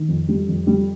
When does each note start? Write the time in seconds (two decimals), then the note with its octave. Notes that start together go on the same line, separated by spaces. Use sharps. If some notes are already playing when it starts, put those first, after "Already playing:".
Already playing: D#3
0.09 F2
0.29 G3
0.48 F2
0.67 G3